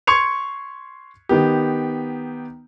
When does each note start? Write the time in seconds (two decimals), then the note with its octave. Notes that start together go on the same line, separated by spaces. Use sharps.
0.07 C6 C#6 G#6 C#7 F7
1.29 D#3 B3 G4